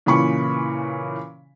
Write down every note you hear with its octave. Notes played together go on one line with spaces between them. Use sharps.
A#2 C#3 E3 B5 C#6